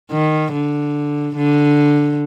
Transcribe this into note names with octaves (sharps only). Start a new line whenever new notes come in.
D#3
D3
D3